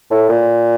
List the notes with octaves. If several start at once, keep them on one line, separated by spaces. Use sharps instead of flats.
A2
A#2